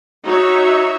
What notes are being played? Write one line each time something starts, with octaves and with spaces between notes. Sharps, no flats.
D#4 F#4 C#5 E5